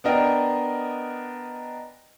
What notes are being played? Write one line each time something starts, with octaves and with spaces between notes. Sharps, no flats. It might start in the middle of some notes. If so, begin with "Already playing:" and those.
B3 D4 A#4 D#5 G5